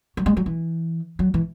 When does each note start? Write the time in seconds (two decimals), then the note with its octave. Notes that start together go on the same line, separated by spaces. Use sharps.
0.17 F#3
0.26 G#3
0.37 F#3
0.46 E3
1.19 F#3
1.34 E3